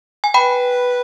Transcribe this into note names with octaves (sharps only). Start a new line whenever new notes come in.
G#5
B4 G5 B5